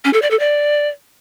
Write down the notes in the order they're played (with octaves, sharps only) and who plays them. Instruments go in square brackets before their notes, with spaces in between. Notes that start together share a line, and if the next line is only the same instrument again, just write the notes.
[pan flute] C#4
A4
D5
A4
D5